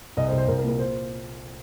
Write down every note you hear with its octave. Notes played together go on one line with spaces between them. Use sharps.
C2 D#5
C5
C2
C5
C2 A#4
A#4
A#2
A#4
C5